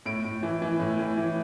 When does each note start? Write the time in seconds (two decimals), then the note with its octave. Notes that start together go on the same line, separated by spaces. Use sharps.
0.06 A2 D7
0.24 A2
0.43 E3
0.62 E3
0.80 A2
0.99 A2
1.17 E3